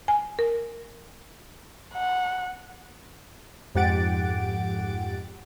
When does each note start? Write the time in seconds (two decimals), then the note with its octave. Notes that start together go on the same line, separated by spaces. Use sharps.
0.08 G#5
0.39 A#4
1.94 F#5
3.75 F2 G#2 G4 F#5 A6 D7